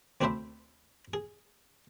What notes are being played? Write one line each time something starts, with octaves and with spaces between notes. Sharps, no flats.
D2 C4 D4 B4 C5 E5
G#4